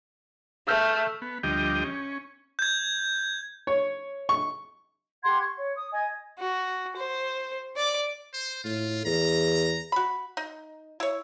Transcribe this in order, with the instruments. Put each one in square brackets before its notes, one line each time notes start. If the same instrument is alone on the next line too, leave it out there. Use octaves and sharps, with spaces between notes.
[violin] A3 [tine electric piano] E6 F6 G6
[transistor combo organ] B3
D2 F3 G3 G4 D#5 G5
C#4
[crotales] G6 G#6
[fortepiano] C#5
C#6
[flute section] G4 F#5 C6 G#6
C#6
C#5
D#6
D#5 G#5
[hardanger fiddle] F#4
C5
D5 D6
[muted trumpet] C5
[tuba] A2 [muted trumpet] F4
[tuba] E2 [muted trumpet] A#5
[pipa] F#4 B5
D#4
E4 C#5